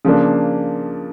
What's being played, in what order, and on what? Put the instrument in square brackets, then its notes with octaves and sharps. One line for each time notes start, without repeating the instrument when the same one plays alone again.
[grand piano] C#3 F3 A#3 D4